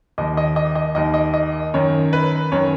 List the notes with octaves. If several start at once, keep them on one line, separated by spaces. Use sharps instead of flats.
D#2 D#3 D#5
D#5
D#5
D#5
D#2 D#3 D#5
D#5
D#5
F#2 D#3 C#5
B4
F#2 D#3 C#5